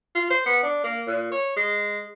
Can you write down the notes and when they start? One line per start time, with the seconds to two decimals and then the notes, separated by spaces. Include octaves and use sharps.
0.15 F4
0.30 C5
0.46 B3
0.63 D4
0.84 A#3
1.07 A#2
1.32 C#5
1.56 G#3